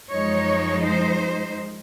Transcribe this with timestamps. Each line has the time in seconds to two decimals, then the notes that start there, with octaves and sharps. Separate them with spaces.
0.10 F#2 F3 G#3 D#4 C#5
0.84 C5